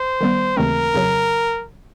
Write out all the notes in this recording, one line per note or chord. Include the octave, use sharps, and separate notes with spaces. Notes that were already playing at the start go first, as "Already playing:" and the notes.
Already playing: C5
D#3 G3 B3
D#2 C#3 E3 A3 C4 A#4
F2 C#3 F#3